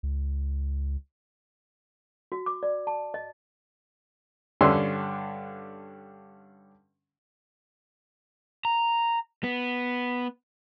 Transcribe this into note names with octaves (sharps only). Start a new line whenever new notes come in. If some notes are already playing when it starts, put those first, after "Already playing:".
C#2
F#4
D6
D5
A5
D#5
G2 D3 C#4 C6 E6
A#5
B3